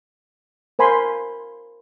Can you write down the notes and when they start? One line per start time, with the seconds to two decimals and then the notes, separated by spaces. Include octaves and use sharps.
0.79 A#4 C5 G#5 B5 C6